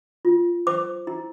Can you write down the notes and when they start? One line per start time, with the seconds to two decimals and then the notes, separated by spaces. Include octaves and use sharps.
0.25 F4
0.67 C5 D6
1.07 E4